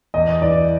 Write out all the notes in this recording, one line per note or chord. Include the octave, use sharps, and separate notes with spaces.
E2 D#5
E3 D5